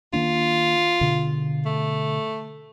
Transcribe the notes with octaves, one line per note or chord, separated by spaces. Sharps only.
D#3 A#3 D4 F4
B2 D3
A3